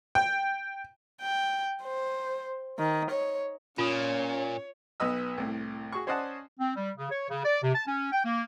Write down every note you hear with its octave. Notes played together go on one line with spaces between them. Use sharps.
G5
G5
C5
D#3
C#5
A#2 C#4 F4 C#5 D#6
B1 B3 B4 D#5 E6
C2 A2
F#4 G#4 C#6
C#4 C5 D5 D#5 F#5 A5
C4
G3
C#3
C#5
C#3
D5
C3
A5
C#4
G5
A#3